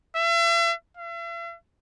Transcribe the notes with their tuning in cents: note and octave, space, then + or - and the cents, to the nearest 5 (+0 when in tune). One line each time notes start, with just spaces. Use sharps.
E5 +40
E5 +45